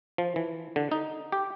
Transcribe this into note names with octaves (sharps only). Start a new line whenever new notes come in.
F3
E3
D3
D#4
G4